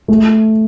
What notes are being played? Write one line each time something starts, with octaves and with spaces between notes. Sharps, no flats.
A3